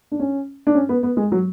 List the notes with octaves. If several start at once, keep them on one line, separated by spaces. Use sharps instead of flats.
D4
C#4
D4
C#4
B3
B3
G#3
F#3